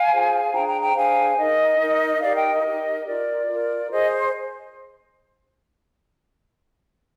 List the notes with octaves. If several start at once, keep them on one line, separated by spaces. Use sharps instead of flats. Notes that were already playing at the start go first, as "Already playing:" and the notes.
Already playing: F5 G#5
F4 G#4 C5
D4 G#4 C5 G5 A#5
G5 A#5
G5 A#5
D4 G#4 C5 F5 G#5
D#4 A#4 D#5
D#4 A#4
D#4 G4 A#4 D5 F5
D#5 G5
D#5
D#4 G4 A#4
F4 A#4 D5
F4 A#4
G#4 C5 D#5